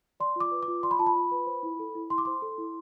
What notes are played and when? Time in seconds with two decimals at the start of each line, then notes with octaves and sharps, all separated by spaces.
0.20 D5 C6
0.36 F4 D6
0.51 B4
0.63 D6
0.68 F4
0.83 D5 C6
0.91 B5
0.99 F4 A5
1.06 B5
1.15 F4
1.32 B4
1.47 C5
1.63 E4
1.79 A4
1.95 E4
2.10 E4 C6
2.18 D6
2.25 C5 C6
2.42 A4
2.58 E4